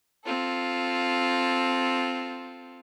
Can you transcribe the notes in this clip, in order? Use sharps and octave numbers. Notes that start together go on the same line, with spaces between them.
C4 F4 A4